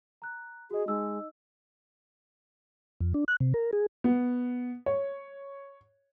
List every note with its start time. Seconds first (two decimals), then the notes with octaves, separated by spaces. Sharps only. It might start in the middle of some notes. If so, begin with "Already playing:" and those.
0.22 A#5 F#6
0.71 F#4 G#4 D#5
0.88 G#3 D#4 D#5 E6
3.01 F2
3.14 D4
3.28 F#6
3.40 C3
3.54 A#4
3.73 G#4
4.04 B3
4.86 C#5